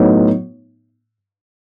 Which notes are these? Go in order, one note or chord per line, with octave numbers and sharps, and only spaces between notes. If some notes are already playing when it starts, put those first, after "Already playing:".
Already playing: A2 F#3 B3 D#4